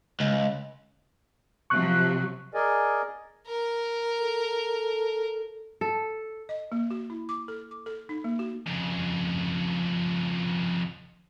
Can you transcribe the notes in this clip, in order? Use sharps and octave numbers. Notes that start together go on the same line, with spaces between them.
C#2
C3 F3 F#3 C#6 F#6
G#4 A#4 D5 D#5 G#5
A#4
A4
A4
D#5
A#3
F#4
E4
D6
A4
D6
A4
D#4
A#3
F#4
F2 C#3